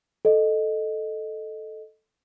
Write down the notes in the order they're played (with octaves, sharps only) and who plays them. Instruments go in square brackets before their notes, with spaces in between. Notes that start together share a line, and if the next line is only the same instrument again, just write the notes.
[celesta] A4 D#5